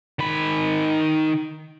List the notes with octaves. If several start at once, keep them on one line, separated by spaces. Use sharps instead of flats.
D#3 B5